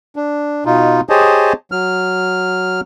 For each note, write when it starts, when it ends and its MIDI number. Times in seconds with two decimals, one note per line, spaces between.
0.16 0.64 62
0.66 1.01 47
0.66 1.01 63
0.66 1.01 65
1.09 1.53 67
1.09 1.53 68
1.09 1.53 72
1.09 1.53 73
1.09 1.53 75
1.09 1.53 81
1.72 2.81 54
1.72 2.81 89